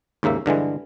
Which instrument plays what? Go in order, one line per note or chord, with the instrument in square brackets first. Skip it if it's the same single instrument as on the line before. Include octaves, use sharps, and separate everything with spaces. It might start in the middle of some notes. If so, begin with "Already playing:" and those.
[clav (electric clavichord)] D#2 G#2 C#3 A#3 E5
G2 D3 E3 G#3